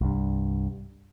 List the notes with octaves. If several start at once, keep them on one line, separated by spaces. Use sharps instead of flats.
C2 G2